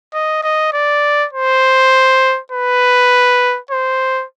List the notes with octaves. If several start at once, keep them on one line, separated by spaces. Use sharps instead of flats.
D#5
D#5
D5
C5
B4
C5